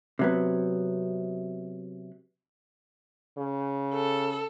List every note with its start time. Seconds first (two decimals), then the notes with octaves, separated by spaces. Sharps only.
0.19 C3 F#3 B3
3.38 C#3
3.93 A4